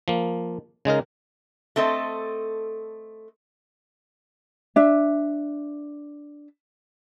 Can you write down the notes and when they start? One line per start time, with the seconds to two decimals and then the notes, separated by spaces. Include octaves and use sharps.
0.08 F3 A#3
0.85 C#3 G#3 D#4 A#4
1.76 A3 C4 A4 D#5
4.76 D4 E5